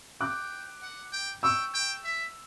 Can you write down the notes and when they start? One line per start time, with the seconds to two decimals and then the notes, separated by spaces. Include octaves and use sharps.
0.20 G5 D6 F#6
0.82 F#5
1.12 G5
1.43 G5 C#6 E6
1.74 G5
2.05 E5